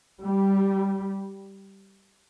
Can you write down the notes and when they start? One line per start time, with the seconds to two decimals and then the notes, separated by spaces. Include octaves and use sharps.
0.22 G3